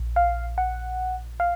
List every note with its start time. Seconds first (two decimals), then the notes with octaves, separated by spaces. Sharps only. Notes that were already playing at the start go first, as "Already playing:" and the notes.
Already playing: A#1
0.16 F5
0.58 F#5
1.40 F5